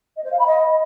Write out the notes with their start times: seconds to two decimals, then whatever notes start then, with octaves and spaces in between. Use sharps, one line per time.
0.16 D#5
0.24 C5
0.31 F5
0.39 B5
0.46 D#5